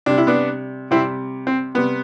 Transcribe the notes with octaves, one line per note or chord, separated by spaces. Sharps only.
C3 G3 D4
E4
B3 D4
C3 G3 C4 E4
C4
C3 G3 B3